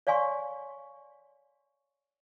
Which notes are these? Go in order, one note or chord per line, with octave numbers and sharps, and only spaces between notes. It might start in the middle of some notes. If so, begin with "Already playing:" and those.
C#5 D5 F5 G#5 C6 C#6